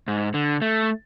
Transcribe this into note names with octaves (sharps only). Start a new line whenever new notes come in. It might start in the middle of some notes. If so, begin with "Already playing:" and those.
G#2
D3
A3